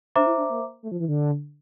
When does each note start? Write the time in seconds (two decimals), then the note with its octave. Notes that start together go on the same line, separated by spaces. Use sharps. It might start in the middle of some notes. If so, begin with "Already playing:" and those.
0.15 D4 C5 E5 A#5 D6
0.27 E4
0.38 D4
0.50 A#3
0.83 A3
0.91 F3
1.00 E3
1.08 D3